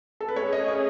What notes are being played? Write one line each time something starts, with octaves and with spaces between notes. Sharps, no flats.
A4
B4
A3 C#4 G#4 C#5
D#5
C#5